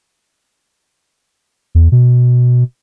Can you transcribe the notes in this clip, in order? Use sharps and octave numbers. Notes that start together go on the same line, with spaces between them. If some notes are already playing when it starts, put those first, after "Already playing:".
E2
B2